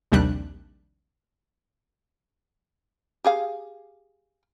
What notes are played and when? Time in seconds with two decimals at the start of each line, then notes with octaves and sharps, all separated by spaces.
0.12 A#1 D#2 C3 G3 D4 F#6
3.24 G4 G#4 F5